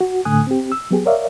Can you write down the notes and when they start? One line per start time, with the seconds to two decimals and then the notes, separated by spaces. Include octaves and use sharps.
0.01 F#4
0.25 A2 D3 A3 G#5 D#6 F#6
0.47 C4 G4
0.72 E6
0.91 F#3 B3 G4 G#4
1.06 A#4 C#5 D5 E5 F5